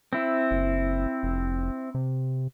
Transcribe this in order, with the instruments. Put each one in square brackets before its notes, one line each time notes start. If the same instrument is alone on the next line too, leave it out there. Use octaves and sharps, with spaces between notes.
[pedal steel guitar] C4 E4
[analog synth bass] F#1
F1
C3